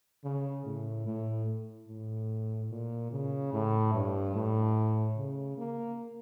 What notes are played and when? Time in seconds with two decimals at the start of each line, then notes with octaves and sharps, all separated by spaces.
0.24 C#3
0.65 A2
1.07 A2
1.88 A2
2.71 A#2
3.11 C#3
3.53 A2
3.94 G2
4.35 A2
5.16 C#3
5.58 A#3